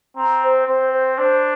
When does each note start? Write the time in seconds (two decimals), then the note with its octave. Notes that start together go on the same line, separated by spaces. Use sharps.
0.16 C4 A#5
0.42 C5
0.67 C4 C5
0.92 C5
1.18 D4 C5